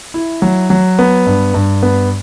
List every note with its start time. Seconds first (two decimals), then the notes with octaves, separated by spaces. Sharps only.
0.14 E4
0.42 F#3
0.70 F#3
0.99 B3
1.26 G2
1.54 G2
1.83 B3